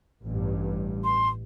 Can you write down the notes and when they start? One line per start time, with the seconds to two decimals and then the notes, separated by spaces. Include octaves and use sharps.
0.25 A1 G2
1.04 C6